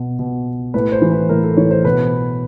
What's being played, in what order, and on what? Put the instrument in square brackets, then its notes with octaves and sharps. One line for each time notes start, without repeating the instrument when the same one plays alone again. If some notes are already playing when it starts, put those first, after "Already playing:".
Already playing: [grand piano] B2
B2
A2 B4
C5
E3
B4
A2 A#4
A4
E3 C#5
C5
B2 B4